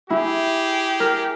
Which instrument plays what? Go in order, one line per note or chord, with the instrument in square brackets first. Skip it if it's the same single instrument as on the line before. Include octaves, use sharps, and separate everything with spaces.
[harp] E4 [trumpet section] G4 G#4
[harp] A#4